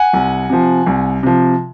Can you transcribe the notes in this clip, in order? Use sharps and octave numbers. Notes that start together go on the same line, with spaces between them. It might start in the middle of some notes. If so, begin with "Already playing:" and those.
Already playing: F#5 G#5
C2
C3 F3
C2
C3 F3